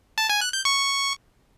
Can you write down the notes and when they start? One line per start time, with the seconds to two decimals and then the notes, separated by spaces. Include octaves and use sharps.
0.18 A5
0.30 G#5
0.41 F#6
0.53 G6
0.65 C#6